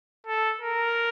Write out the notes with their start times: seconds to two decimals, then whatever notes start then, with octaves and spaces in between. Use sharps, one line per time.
0.27 A4
0.60 A#4